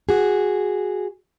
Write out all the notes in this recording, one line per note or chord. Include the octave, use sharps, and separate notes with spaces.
F#4 G#4